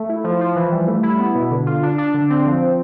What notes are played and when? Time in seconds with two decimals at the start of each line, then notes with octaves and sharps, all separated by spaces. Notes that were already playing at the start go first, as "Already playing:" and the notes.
Already playing: A3
0.09 E4
0.24 F3
0.41 F3
0.56 E3
0.72 G3
0.87 A3
1.03 E4
1.19 B3
1.35 B2
1.51 D3
1.66 F4
1.83 D4
1.98 D4
2.14 D3
2.30 C4
2.46 F3
2.62 F3